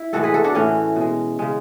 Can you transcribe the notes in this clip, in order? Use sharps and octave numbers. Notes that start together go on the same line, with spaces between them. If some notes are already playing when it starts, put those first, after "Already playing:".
Already playing: E4
A2 E3 G#3 F#4 A4
G#4 B4
F#4 A4
D4 F#4
A2 E3 A3 C#4
B2 G#3
C#3 G#3